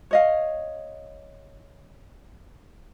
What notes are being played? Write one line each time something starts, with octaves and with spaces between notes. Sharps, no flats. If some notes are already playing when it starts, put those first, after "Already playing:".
C#5 D#5 F5